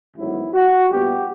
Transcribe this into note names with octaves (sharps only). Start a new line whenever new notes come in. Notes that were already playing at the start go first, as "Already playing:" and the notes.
A1 G#2 D#3 F#3 B3 E4
F#4
A#1 A#2 G3 B3 G4